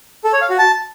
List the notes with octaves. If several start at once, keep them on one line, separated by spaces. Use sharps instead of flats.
A4
C#5
F5
F#4
A5